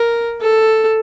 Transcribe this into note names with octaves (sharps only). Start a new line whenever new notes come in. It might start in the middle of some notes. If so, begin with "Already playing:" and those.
Already playing: A#4
A4